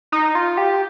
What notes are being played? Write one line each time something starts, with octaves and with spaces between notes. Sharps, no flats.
D#4
F4
G4